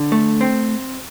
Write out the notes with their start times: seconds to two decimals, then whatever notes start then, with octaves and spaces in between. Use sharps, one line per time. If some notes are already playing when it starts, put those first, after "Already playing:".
Already playing: D3
0.12 A3
0.41 C4